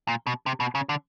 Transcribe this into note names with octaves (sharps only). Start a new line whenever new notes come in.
A#2
B2
C3
B2
C#3
D3